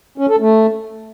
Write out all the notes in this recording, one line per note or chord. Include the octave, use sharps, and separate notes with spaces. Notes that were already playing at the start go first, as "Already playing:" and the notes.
C#4
A4
A3